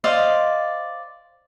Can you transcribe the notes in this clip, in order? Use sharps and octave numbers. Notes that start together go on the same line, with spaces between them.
C5 D5 D#5 F5